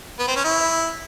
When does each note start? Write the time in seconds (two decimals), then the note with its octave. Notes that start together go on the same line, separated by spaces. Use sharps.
0.19 B3
0.28 C4
0.36 C#4
0.45 E4